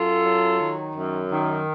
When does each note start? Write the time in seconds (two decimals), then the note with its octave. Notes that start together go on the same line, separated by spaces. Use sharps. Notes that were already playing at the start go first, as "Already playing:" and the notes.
Already playing: F#2 F4 A4
0.25 F#3
0.59 D#3
0.95 F#2
1.30 D#3